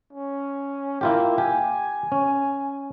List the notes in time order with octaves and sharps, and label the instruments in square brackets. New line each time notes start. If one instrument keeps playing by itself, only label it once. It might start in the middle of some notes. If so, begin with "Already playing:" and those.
[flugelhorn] C#4
[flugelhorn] A#3 [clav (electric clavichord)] E4 F4 G4
[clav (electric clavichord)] G4 [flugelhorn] G#5
[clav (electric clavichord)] C#4